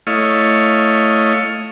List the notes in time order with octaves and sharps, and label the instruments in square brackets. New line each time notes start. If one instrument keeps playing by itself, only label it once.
[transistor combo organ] A3 E4 C#5 D#5 F5